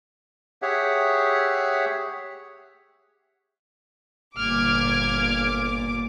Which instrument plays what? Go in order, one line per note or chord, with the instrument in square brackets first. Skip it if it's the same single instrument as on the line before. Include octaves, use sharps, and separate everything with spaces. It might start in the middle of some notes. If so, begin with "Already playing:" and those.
[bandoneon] G4 G#4 C#5 E5 F#5
[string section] G1 A#2 D6 [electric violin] F6 G#6